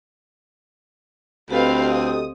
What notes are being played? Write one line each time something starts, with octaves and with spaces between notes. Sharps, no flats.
D2 C4 G4 A4 B4 D#5 F5
D#6